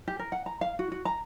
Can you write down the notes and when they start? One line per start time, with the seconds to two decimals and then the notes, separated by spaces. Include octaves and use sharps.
0.08 G4
0.19 A#4
0.32 F#5
0.46 A#5
0.61 F5
0.79 F#4
0.92 F#4
1.05 A#5